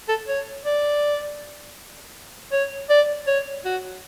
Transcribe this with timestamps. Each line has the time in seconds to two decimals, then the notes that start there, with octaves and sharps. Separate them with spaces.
0.09 A4
0.28 C#5
0.65 D5
2.52 C#5
2.90 D5
3.27 C#5
3.65 F#4